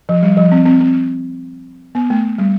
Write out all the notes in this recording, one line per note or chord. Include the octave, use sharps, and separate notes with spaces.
F3
G3
F3
C4
C4
C4
B3
A3
G3